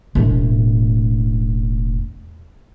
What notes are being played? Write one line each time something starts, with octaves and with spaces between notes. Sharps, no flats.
E1 A2